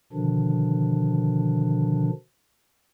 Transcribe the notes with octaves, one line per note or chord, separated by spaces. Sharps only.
B2 D3 D#3 F3 D4